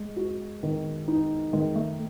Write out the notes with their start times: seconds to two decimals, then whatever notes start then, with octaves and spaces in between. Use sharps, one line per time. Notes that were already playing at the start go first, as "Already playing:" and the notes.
Already playing: G#3
0.16 F#4
0.63 D#3
1.08 D#4
1.53 D#3 G#3
1.76 A3